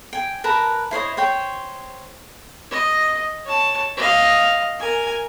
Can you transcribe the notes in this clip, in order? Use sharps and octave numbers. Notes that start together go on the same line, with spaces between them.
G5 G#5
A#4 B4 A5 A#5
E4 C5 C#5 D#5
C5 C#5 G5
D#5
C#5 A5
D#5 F5
A#4 G#5